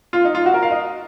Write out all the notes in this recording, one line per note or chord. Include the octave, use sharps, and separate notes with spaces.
F4
D#4
F4
F#4
A#4
F5
D#5